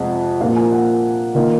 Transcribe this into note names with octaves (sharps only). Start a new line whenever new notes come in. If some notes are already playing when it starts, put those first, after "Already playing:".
Already playing: F2 C3 F3 G#3 F#5
A#1 A#2 F3 A#3 F5
G#5
F#5
D#3 A#3 F4